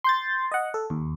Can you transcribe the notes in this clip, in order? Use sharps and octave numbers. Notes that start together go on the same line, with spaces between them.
C6 G6 A6
D#5 F#5
A4
D#2